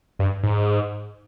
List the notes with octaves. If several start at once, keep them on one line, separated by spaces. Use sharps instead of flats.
G2
G#2